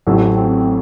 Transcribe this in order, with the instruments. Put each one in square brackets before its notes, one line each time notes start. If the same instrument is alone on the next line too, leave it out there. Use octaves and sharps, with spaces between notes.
[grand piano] A1 A2 F#3 A3 C4
[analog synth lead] C4